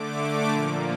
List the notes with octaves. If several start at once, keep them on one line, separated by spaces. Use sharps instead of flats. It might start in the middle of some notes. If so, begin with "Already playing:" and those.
Already playing: D3 A3 D6
D6
A#2 F3 A#3